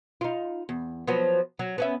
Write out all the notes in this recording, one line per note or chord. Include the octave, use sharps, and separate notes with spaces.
D#4 F4
E2
F3 F#3 B3
F#3
B3 C#4 E5